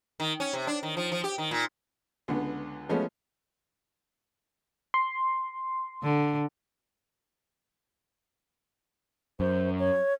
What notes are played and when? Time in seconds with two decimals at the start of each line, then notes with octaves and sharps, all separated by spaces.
0.20 D#3
0.40 C#4
0.53 C3
0.67 D4
0.83 D#3
0.97 F3
1.12 F3
1.24 G4
1.38 D#3
1.51 A#2
2.28 C#2 D3 B3
2.89 F3 G#3 A3 B3 C#4
4.94 C6
6.03 D3
9.40 F#2 C5
9.79 C#5